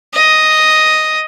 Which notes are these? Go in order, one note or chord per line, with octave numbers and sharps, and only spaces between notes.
D#5